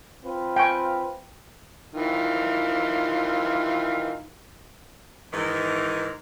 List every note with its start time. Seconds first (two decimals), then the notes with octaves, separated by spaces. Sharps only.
0.23 C4 F4 B4
0.56 G5 G#5 C#6
1.95 D#3 E3 F4
5.33 G#2 D#3 E3